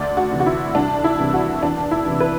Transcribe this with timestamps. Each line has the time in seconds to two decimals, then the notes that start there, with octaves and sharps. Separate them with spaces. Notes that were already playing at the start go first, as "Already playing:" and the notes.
Already playing: D2 D5
0.17 F#4
0.31 C3 E3
0.40 F#4
0.46 E4
0.75 C2 D4
1.04 E4
1.19 C3 E3
1.34 F#4
1.63 E2 D4
1.91 E4
2.06 C3 E3
2.20 B4